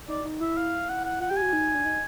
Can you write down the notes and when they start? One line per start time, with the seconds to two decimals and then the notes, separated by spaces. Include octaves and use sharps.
0.08 D#4 D5
0.24 D#4
0.41 E4 E5
0.57 F5
0.89 F#5
1.05 F#5
1.20 F4 F#5
1.30 G4 G5
1.36 G#5
1.42 F#4
1.53 D#4
1.75 D4
1.85 D#4